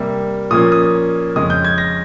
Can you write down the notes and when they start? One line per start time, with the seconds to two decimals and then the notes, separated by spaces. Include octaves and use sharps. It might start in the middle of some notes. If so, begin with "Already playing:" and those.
Already playing: C3 G3 A#3
0.50 A#2 F3 A#3 C#4 D#6
0.72 D#6
1.36 F2 C#3 G#3 C#4 D#6
1.50 G6
1.65 G#6
1.78 A#6